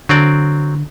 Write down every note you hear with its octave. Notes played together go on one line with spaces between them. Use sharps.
D3 F#3 C4 D5